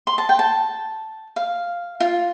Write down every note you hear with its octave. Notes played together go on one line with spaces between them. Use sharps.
C6
A5
G5
A5
F5
F4